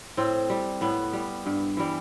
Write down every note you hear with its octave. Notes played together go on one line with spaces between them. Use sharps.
A2 C4
G3
A2 B3
G3
G2
E3 G3